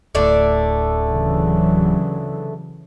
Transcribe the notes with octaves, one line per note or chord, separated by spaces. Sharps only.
D1 A2 D3 A3 D5
C#3 E3 F#3